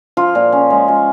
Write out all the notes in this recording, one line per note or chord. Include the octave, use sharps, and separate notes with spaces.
F3 F4
A#2
C#4
G#3
G#3